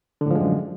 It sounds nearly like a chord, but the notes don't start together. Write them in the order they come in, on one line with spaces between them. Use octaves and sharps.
D3 A2 F3 G#3 F#2